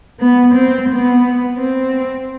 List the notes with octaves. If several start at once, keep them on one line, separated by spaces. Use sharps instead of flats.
B3
C4
B3
C4